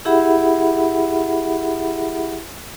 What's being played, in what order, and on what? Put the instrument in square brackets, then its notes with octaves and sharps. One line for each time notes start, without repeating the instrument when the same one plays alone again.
[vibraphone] E4 G4 G#4 E5 F#5 B5